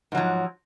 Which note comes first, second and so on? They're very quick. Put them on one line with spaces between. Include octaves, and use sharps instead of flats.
G#2 F#3 F3